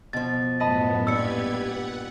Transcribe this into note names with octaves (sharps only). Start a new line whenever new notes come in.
B2 F3 A6
F#2 A2 B3 D#5 A5 B5
G2 A#2 B3 G4 B4 E6 G#6 C#7
F#5